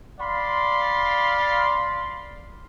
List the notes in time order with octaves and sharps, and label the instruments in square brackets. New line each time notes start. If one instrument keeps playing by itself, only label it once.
[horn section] D5 F5 B5 C6